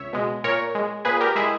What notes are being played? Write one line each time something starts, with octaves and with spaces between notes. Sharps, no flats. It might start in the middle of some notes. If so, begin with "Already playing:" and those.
Already playing: C#2 C#5 E5
B2 G#3
A#2 A#4 C#5
G#3
A#2 G#4 B4
G4 A#4
G#3 E4 G#4